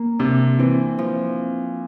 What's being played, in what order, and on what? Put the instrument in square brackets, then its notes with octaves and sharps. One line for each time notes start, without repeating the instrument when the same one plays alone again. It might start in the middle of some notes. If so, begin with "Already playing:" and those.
Already playing: [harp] A#3
[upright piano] C3 [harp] D4
[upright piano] E3 [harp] C4
[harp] F3